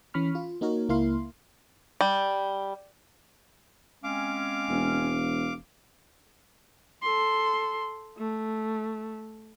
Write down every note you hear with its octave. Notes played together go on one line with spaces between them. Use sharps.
E3 C#4 B5 C#6 F6
F4
A#3 D#4 F#4 A#4 C#5
C#2 A#3 E4 A#4 F5 C6
G3
G#3 C4 C#4 F5 D6
E1
A4 C6
A3